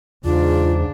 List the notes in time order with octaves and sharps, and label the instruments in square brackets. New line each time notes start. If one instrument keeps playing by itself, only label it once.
[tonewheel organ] E2 [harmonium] G#2 [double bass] C#3 D4 [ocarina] F4